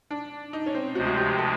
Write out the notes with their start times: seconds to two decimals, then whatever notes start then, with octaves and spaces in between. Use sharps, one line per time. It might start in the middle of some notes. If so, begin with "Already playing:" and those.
0.11 D4
0.53 D#4
0.66 C#4
0.75 C4
0.95 D2 C3 F3 G#3 F#4
1.07 F#4
1.17 G4
1.38 A4